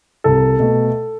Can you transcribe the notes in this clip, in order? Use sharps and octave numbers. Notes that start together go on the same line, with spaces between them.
C2 A4
B2 A3